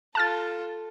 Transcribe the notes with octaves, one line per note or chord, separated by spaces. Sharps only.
F4 A4 A5 F6 A6